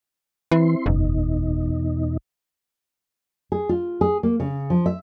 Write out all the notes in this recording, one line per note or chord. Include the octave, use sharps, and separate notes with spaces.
E3 C4 E4 C6
F#1 E2 B2 D#4
G#4
F4
G#4
A#3
C#3
F3
E5